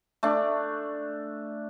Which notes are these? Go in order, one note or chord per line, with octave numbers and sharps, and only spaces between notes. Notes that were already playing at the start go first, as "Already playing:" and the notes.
A3 D4